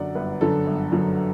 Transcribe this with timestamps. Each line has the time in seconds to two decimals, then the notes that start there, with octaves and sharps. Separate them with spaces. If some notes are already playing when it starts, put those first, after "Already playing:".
Already playing: F#2 D3 F#3 D5 F#5
0.15 G1 B4
0.41 F#2 D3 F#3 A4
0.67 G1
0.92 F#2 D3 F#3